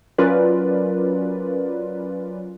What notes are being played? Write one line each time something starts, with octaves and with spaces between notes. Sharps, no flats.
F#3 C#4 F4 A#4 B4 D5